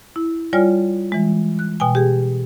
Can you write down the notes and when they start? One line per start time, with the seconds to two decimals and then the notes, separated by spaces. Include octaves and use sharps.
0.16 E4
0.53 G3 F4 C#5 D5 G#5 F6
1.12 E3 G#3
1.59 F#6
1.80 B2 G5 G#5
1.95 G4 G#4